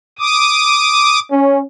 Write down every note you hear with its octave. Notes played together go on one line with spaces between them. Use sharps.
D6 D#6
C#4